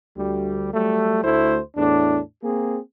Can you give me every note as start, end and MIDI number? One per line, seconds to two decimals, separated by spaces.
0.17 0.73 38
0.17 0.73 55
0.74 1.21 54
0.74 1.21 55
0.74 1.21 57
1.24 1.59 38
1.24 1.59 57
1.24 1.59 64
1.24 1.59 72
1.77 2.19 40
1.77 2.19 45
1.77 2.19 62
2.44 2.79 58
2.44 2.79 60
2.44 2.79 68